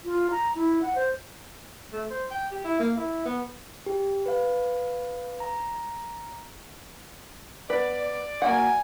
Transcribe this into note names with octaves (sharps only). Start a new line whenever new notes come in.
F4
A#5
E4
F#5
C5
A3
C5
G5
G4
E4
A#3
E4
B3
G4
B4 F5
A#5
B3 B4 D5
A#3 F#4 F#5 G#5